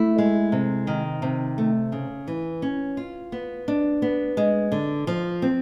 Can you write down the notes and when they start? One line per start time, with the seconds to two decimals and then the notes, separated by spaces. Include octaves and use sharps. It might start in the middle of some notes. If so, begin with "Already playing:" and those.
Already playing: A3 E4
0.18 G#3
0.52 C3
0.87 D#3
1.22 C3
1.58 A3
1.92 C#3
2.28 E3
2.62 C#4
2.97 F4
3.32 B3
3.68 D4
4.02 B3
4.37 G#3
4.72 D3
5.07 F3
5.42 C4